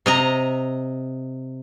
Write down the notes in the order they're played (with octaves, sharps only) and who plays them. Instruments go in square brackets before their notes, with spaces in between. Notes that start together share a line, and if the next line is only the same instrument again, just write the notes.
[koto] C3 D#5 A#5